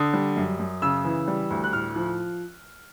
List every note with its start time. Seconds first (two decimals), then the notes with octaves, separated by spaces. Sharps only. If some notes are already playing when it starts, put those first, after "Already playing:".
Already playing: D3 D#6
0.13 G3
0.36 F#2
0.59 F#2
0.82 C#3 E6
1.05 E3
1.28 G3
1.50 D2
1.64 F#6
1.73 A2 F6
1.96 F3